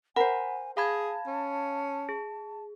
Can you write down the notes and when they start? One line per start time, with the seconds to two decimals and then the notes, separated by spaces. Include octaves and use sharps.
0.16 A#4 C5 F#5 G#5 B5
0.77 G#4 F5 A5 B5 G#6
1.27 C#4
2.09 G#4